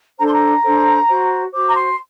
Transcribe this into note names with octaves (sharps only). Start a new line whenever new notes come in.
D4 A4 C5 A#5
C6
A#5
D4 A4 C5
F#4 C5
F#4 C5 D6
A#5
C6